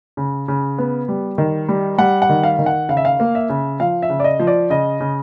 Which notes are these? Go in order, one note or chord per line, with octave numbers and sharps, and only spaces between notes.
C#3
C#3
B3
G3
D#3
G3
G3 F#5
F#5
D#3
F5
D#3
F#5
C#3 F5
E5
F5
A#3
E5
C#3
F3 F5
E5
C#3
D5
D#5
F3
D5
C#3 D#5
C#3